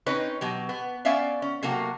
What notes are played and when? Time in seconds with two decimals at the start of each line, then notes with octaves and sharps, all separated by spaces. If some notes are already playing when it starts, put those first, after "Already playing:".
0.06 C4 C#4 D#4 B4 C#5
0.41 B2 F#3 G4
0.69 B3
1.05 B3 C#4 D5 E5 F5
1.42 C#4
1.63 C3 F#3 A3 A#3 F#4